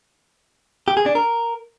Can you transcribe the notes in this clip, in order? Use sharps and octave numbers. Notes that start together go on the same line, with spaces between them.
G4
G#4
D4
A#4